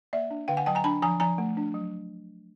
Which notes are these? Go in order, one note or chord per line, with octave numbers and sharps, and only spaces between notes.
A#3 D5 E5
D4
D3 F5 G5
F#5 G#5
F#3 G5 A5
G#5 A#5
D4 A5 B5
F3 G#5 A#5
F3 G#5 A#5
A3
D4
F#3